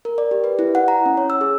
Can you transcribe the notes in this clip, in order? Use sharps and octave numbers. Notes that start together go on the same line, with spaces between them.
A#4
D5
G4
B4
E4
F#5
A#5
C#4
C#5
E6
G#4